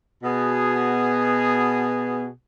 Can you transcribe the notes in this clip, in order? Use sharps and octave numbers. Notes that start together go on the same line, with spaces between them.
B2 B3 G#4